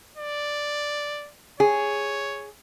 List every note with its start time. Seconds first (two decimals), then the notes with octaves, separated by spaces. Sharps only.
0.17 D5
1.60 G#4 C#5